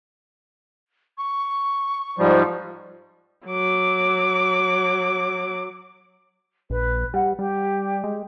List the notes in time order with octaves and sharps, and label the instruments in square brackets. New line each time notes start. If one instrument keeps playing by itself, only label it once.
[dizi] C#6
[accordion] G#2 F3 G3
[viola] F#3 D6
[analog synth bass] A#1 [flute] B4
[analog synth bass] G3 [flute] F#5
[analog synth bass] G3 [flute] G4
[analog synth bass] G#3